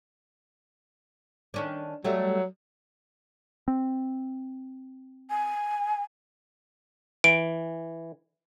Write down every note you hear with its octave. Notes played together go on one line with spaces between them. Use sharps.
D#3 C#4 D4
F#3 G3 A3
C4
G#5
E3 D7